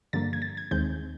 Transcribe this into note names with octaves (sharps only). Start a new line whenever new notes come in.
G2 D3 F3 A#3 A6
G#6
A6
G#6
D#2 D#3 G#3 C4 D#4 G6